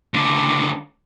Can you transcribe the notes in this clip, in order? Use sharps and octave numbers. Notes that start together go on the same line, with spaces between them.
C#2 D3